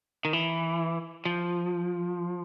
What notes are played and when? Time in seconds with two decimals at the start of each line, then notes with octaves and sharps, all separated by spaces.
0.25 D#3
0.33 E3
1.25 F3